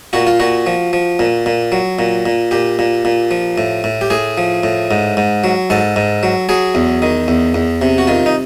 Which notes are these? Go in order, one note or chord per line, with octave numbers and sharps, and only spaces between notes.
A#2 F#4
F4
A#2 F#4
F3
F3
A#2
A#2
F#3
A#2
A#2
A#2 G4
A#2
A#2
F3
A2
A2
G4
A2 G#4
F3
A2
G#2
G#2
F#3
G#2 A4
G#2
F#3
F#3 G#4
E2
D#3
E2
E2
C3
F#4
D#3 F4
D#4